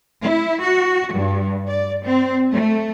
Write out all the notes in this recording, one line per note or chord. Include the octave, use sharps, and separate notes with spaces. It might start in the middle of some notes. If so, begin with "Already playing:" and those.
E4
F#4
G2
D5
C4
A3